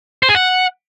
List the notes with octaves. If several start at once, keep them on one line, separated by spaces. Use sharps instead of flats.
C5
G#4
F#5